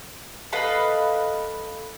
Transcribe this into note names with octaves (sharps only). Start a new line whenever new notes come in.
A4 B4 D#5 F5